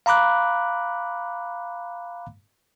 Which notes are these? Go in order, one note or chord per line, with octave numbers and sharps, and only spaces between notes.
F5 A#5 B5 D6 F#6